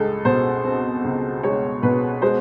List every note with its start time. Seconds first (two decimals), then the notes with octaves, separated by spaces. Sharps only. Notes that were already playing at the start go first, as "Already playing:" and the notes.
Already playing: C#2 G#3 A4
0.25 B2 C5
0.64 C4
1.04 C#2
1.43 G#3 C#5
1.83 B2 B4
2.22 G#3 C5